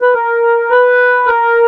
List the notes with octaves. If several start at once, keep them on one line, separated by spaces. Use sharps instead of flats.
B4
A#4
B4
A#4